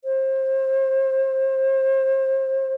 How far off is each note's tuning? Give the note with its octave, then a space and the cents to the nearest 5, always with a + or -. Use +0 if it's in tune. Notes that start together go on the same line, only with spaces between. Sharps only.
C5 +30